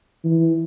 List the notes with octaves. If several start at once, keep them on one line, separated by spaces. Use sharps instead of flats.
E3